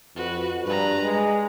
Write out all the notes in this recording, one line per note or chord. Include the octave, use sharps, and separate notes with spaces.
F2 F#4 B4
G2 B4 A#5
G#3